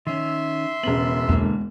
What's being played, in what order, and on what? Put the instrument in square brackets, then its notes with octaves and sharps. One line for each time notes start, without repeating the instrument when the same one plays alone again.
[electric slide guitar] D#3 C#4 [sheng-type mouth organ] E5 C6
[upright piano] E1 C#3 F#7 [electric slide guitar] B3
[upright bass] E2 G#3 [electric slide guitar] D3 A#3